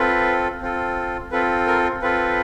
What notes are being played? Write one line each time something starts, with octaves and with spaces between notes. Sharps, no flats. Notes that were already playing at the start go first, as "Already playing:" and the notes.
Already playing: C4 F4 A4 B4
C4 F4 A4
C4 F4 A4 B4
A#4
C4 F4 A4 B4